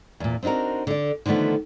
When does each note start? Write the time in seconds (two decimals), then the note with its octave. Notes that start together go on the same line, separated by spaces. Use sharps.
0.20 E2 A#2
0.43 C4 D4 D#4 F#4 A#4
0.87 D3 D5
1.26 D3 D#3 F3 A3 B3